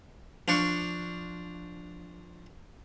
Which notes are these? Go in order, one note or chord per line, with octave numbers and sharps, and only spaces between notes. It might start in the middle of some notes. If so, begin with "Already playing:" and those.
F3 D4 C#6